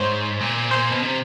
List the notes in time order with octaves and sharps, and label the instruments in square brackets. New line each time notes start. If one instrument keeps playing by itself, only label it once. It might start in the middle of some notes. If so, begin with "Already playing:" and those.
Already playing: [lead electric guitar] G#2 [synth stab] C5 C#5
[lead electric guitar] A#2
[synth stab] C5
[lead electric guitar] B2
C3